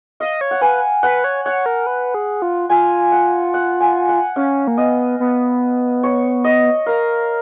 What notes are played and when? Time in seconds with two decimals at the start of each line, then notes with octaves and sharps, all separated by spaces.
0.20 D#5 F5
0.41 C#5
0.51 F#5
0.61 B4 G#5
1.03 B4 F#5
1.24 C#5
1.45 C#5 F#5
1.66 A#4
1.87 B4
2.14 G#4
2.42 F4
2.69 F4 G#5
3.12 F#5
3.54 F#5
3.80 G#5
4.09 F#5
4.36 C#4 F5
4.68 A#3
4.77 B3 D#5
5.20 B3
6.03 C#5
6.44 D#5
6.86 A#4 F5